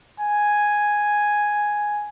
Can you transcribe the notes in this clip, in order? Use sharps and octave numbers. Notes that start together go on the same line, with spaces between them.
G#5